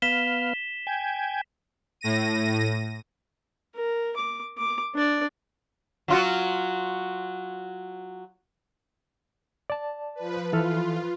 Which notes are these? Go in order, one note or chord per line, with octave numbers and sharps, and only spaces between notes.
B3 F5 B6 E7 G7
G5 G#5
A2 A#6 D#7
A#4
D6
D6
D4 D5
F#3 F4 F#4
D5 A5
F3 B4
E3 F4 A4 F6